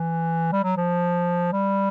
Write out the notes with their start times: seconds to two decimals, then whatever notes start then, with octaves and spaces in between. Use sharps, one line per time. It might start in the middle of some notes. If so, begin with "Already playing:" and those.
Already playing: E3
0.53 G3
0.64 F#3
0.77 F3
1.52 G3